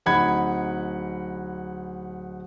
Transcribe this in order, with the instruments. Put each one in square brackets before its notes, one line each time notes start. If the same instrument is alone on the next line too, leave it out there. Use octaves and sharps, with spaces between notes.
[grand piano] D1 D#4 F#5 B5 G#6